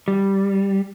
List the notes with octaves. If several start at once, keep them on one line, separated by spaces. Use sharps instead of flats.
G3